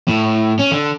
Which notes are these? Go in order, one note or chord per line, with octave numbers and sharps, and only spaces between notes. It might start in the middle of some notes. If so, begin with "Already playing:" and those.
A2
C#4
D3